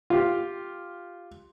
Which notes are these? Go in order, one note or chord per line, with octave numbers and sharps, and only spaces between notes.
F4 G4